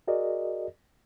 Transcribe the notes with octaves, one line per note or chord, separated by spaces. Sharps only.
F#4 G#4 A#4 D5 D#5